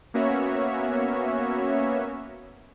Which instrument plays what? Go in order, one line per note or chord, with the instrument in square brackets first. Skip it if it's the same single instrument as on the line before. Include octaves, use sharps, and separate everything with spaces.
[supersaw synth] A#3 B3 C#4 F#4 C#5 E5